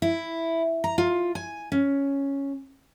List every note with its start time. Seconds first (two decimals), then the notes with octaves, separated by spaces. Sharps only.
0.02 E4
0.84 A#5
0.98 F4
1.35 G#5
1.72 C#4